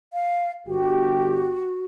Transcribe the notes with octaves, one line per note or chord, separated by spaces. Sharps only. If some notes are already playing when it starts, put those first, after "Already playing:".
F5
G1 F#4 G4